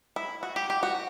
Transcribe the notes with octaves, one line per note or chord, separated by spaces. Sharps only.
E4
F#4
G4
G4
F#4